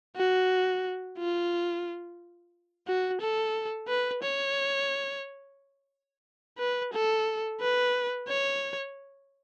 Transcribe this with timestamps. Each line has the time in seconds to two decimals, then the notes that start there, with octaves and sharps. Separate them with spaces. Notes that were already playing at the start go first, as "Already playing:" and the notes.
0.16 F#4
1.18 F4
2.87 F#4
3.21 A4
3.88 B4
4.23 C#5
6.59 B4
6.93 A4
7.60 B4
8.28 C#5